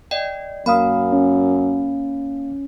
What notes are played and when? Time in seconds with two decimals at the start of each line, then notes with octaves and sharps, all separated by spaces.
0.11 D5 D#5 G5
0.66 F#2 A#3 F5 B5 D#6
1.12 C#4